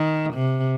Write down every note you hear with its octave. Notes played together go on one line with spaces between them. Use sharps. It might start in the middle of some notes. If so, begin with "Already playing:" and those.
Already playing: D#3
C3